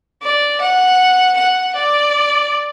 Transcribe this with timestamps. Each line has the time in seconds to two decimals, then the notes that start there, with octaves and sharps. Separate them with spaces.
0.22 D5
0.61 F#5
1.37 F#5
1.75 D5